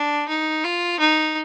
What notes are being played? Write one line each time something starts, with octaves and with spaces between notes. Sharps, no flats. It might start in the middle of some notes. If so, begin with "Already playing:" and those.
Already playing: D4
D#4
F4
D#4